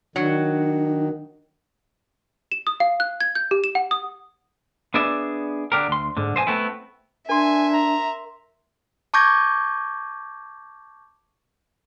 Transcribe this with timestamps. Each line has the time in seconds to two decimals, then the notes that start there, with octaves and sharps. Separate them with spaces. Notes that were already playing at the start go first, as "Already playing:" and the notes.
0.16 D#3 F#3 D4
2.52 E7
2.67 D#6
2.80 F5
3.00 F#6
3.21 G#6
3.35 G6
3.51 G4
3.64 E7
3.75 F#5
3.91 D#6
4.94 B3 D4 G#4 D5 E5
5.72 D3 D4 G4 A#4
5.88 D2 C6
6.17 G#2 D3
6.35 B1 C5 D#5 G#5
6.47 A3 B3 C4 E4
7.29 D4 A#4 E5 G#5 C6
7.74 A#5
9.14 A5 C#6 D6 G6 G#6 A#6